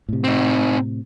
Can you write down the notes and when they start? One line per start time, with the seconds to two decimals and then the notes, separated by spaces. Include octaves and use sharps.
0.09 A2 C3
0.24 C4 D#4